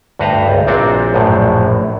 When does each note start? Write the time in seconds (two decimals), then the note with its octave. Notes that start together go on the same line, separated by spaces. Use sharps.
0.19 D2 G2 F#4 B4 C5 A#5
0.48 C#2
0.67 A#1 A#2 C4 D4 F#4
1.14 A#1 F#2 A2